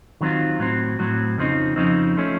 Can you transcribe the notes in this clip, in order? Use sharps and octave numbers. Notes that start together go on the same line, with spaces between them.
D#3 F#3 C4 F4
A2 F#3 C4
A2 F#3 C4
F2 C#3 F3 C4 D#4
F2 C#3 F3 C4 D#4
F3 A3 C#4